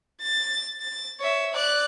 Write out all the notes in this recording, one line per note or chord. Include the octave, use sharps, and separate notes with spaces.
A6
A6
C#5 E5
D5 F#6